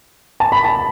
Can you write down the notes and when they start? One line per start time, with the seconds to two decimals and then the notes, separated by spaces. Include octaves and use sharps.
0.40 A5
0.52 B5
0.64 A5